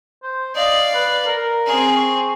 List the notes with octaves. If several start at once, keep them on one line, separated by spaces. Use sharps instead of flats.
C5
D5 D#5 F5
B4
A#4
C4 G#4
C#6